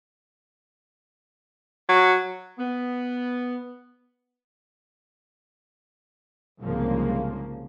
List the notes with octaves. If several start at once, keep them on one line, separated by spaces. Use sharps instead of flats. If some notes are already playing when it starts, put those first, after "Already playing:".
F#3
B3
C2 G#2 C#3 F3 A#3